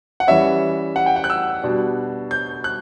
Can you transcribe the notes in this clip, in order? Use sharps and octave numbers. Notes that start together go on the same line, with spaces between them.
F#5
E3 G3 C#4 E5
F#5
G5
F#5
F#6
E6
B2 G3 D4
G6
F#6